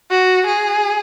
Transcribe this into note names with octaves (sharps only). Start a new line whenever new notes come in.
F#4
G#4